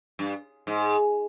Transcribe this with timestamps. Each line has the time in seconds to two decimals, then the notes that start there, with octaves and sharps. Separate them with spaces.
0.19 G2
0.67 G#2